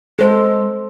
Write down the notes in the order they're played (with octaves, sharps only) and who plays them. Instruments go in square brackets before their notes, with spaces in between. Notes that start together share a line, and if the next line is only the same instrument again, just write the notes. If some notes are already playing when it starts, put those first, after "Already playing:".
[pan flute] G#3 [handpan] A4 C5